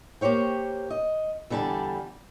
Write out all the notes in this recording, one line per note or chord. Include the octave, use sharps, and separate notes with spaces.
A#3 G4 C5 C#5 G5
D#5
E2 D3 G3 D5 A5